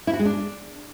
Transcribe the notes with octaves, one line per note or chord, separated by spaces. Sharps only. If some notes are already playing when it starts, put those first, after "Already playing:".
E4
F#4
G#3
D4